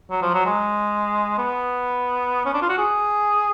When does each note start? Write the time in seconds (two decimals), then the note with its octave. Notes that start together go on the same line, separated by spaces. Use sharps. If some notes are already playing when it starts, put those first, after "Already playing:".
0.11 F#3
0.22 F3
0.34 F#3
0.46 G#3
1.38 B3
2.46 C#4
2.54 D4
2.62 F4
2.69 F#4
2.78 G#4